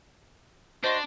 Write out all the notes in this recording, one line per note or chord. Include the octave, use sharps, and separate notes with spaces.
D4 F#4 C5 D#5 C6 F#6